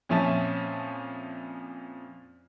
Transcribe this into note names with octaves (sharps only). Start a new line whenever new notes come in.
F2 A#2 F3 C#4 E5 A5